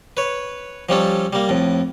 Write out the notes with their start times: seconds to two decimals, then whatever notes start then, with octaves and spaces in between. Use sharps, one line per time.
0.17 B4 C#5
0.89 F3 G3 C#4 A4
1.33 G3 A#3
1.49 F2 A2